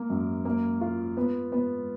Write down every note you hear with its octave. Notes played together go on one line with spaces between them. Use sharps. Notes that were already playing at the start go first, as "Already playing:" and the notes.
Already playing: A#3
F#2
A#3
F4
B3
B3